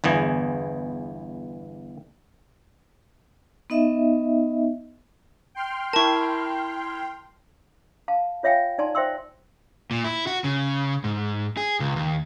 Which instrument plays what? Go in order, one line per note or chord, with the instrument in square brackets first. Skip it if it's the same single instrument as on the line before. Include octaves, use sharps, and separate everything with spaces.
[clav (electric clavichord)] G1 E2 E3 G#4
[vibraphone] B3 D#4 D#5 E5
[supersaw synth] G5 C6 F6
[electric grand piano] E4 A#4 [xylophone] A5 C#6
[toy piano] F5 A5
F4 C#5 E5 F5 G5 G#5
D#4 D5 G#5 A5 C6
C5 E5 G5 C6 E6
[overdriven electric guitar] A#2
E4
F#4
C#3
G#2
G#4
C#2
D#2